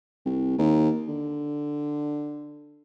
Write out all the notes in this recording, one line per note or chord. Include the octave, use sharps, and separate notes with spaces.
C2
D#2
D3